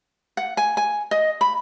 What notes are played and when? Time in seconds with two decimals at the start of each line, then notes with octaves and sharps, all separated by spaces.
0.37 F#5
0.57 G#5
0.77 G#5
1.11 D#5
1.41 B5